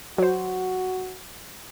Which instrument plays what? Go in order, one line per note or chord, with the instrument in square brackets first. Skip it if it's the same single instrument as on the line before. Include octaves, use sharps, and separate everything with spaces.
[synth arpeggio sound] F#3 C5 [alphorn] F#4